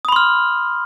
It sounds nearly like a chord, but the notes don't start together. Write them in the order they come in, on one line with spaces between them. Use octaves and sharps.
D#6 B5 C6 F6